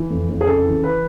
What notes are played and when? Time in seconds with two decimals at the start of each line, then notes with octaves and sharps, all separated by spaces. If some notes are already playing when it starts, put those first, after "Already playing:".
Already playing: E3
0.10 F2
0.29 F2
0.41 G#4
0.46 C#3 A4
0.65 E3
0.83 E3 B4